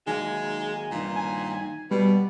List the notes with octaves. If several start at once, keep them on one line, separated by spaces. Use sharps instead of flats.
D#3 F#3 G#3 A#3 G#5
G2 A#2 D#3
G#5
B2 G3 B3